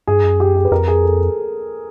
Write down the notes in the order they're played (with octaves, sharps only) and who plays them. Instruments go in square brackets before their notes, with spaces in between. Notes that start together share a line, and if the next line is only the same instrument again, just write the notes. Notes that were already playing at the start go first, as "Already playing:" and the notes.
[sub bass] G2 [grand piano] G#4
[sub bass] F#2
[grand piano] G4
G#4
B4
[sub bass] F2 [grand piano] A#4
[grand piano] G#4
A4